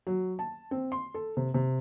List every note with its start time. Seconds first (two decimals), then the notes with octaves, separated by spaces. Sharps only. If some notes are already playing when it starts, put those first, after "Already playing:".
0.07 F#3
0.39 A5
0.71 C4
0.92 C6
1.14 A4
1.37 C3
1.54 C3